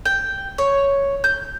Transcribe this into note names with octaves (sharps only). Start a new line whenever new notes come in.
G5
C#5
G6